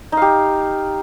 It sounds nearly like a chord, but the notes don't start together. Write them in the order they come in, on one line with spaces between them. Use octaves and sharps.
D#4 F5 G4